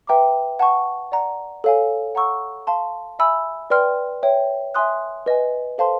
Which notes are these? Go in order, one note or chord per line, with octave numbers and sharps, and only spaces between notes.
B4 E5 G5 A#5 D6
F#5 A5 C#6
D5 F#5 A#5
A4 C#5 F5 G#5
F#5 A#5 C#6 E6
F5 A5 C6
E5 G#5 B5 E6
B4 D5 G5 C6 F6
C#5 E5 G5
E5 G#5 C6 D#6 F#6
B4 D#5 G#5
A4 C5 F5 A5 C6